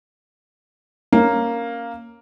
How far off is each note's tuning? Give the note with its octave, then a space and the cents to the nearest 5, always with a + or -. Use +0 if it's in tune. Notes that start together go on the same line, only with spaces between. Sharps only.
A#3 +0 C#4 +0